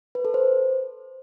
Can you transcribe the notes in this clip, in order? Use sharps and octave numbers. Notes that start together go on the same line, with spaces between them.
B4
A4
C5